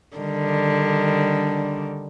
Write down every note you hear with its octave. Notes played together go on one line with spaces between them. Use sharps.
D3 D#3 G3